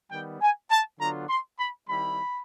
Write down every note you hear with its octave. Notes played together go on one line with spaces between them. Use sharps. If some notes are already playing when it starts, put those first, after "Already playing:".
D#3 G3 B3 G5
G#5
A5
D3 F#3 B3 D4 F4 A#5
C6
B5
D#3 G3 C4 E4 B5